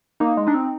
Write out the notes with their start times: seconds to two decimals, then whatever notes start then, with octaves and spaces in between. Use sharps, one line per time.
0.20 A#3 D#4
0.37 G#3
0.47 D4 D#4
0.54 C4